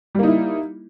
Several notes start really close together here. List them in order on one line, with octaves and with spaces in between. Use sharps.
G3 A#3 D#4 E4